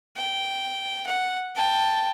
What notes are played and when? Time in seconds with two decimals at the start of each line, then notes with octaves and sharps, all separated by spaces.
0.16 G5
1.07 F#5
1.56 G5 A5